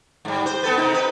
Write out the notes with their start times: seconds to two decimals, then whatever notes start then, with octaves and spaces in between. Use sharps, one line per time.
0.25 G#2 G3
0.46 C5
0.63 B3 A4 B4
0.77 C3 D#4
0.94 B4